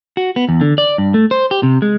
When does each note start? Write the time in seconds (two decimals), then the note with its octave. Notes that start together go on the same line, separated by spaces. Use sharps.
0.17 F#4
0.36 B3
0.49 E2
0.61 D3
0.78 D5
0.98 G2
1.14 A3
1.31 C5
1.51 G4
1.63 C3
1.82 G#3